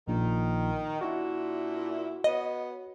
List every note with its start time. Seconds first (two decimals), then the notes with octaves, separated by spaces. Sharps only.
0.08 A#1 A#2 D#3
1.01 A#2 D4 E4 F#4
2.24 B3 C#5 D#5